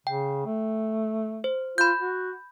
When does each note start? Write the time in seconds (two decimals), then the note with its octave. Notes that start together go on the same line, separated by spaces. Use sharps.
0.07 C#3 G5
0.46 A3
1.44 C5
1.78 F4 B5 G6
1.99 F#4